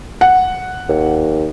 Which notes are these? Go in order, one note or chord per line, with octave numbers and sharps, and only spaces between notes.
F#5
D#2